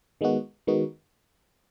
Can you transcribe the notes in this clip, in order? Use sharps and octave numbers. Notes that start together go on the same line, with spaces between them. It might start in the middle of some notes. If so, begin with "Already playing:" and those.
D#3 G#3 B3 D#4 F#4
D#3 G#3 B3 D#4 F#4